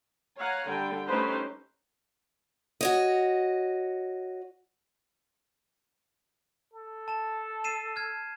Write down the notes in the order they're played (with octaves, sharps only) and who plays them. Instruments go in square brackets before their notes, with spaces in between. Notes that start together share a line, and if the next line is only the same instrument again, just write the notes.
[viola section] C#5 F5 F#5 G#5 A#5
D3 G3 G5
A3 C#4 D#4 G4 B4 C5
[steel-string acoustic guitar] F#4 C#5 D#5
[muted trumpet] A4
[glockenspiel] A5 E7
C7 D#7 E7
F6 G#6